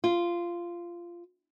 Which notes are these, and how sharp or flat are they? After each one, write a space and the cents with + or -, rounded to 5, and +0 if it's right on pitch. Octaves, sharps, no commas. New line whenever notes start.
F4 -15